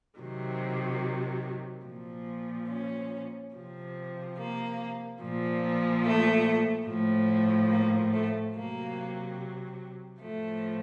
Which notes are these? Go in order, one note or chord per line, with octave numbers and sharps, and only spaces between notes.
C3 D#3 F#3
A#2 F3
C#4
C3 F3
A#3
A#2 F3
A3
A2 F3
A#3
A3
C3 F#3 A#3
A2 F3 A3